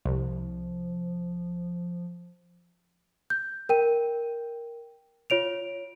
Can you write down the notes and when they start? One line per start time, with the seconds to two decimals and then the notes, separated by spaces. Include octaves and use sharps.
0.06 C2 F3
3.30 G6
3.69 A#4 G5 D#7
5.30 F4 C#5 D7 F7